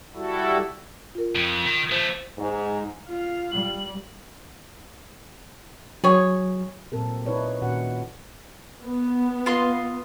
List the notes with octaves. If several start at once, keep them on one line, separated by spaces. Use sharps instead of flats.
G3 E4 F#4 A4
F4 A#4
F2
D#3
F3 A3 C5
G#2
F4 F5
G3 F#7
F#3 G#4 C#5
A#2 F#3 C4 A4 A#4
D#4 E4 B4 C#5 D5
A#2 D#3 C#4 F#4 F#5
B3
F4 D#5 C6